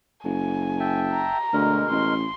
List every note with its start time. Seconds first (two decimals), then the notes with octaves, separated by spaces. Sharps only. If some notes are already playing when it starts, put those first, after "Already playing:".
0.25 F#1 G#5
0.80 E5 G5 A5
1.12 A#5
1.53 D2 B2 G#3 A#4
1.91 A1 C6